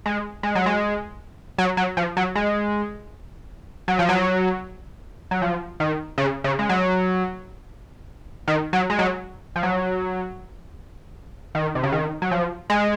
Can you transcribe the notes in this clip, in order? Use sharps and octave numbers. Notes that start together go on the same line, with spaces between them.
G#3
G#3
F#3
G#3
F#3
F#3
F3
F#3
G#3
F#3
F3
F#3
F#3
F3
D#3
C#3
C#3
G#3
F#3
D#3
F#3
G#3
F#3
F3
F#3
D#3
C3
C#3
D#3
F#3
F3
G#3